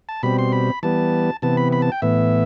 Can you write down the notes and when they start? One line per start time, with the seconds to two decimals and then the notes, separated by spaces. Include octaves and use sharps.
0.09 A5
0.23 B2 G3 C4 B5
0.39 C6
0.52 B5
0.83 E3 G3 B3 A5
1.42 C3 E3 B3 A5
1.57 B5
1.72 B5
1.82 A5
1.92 G5
2.02 A2 E3 B3 E5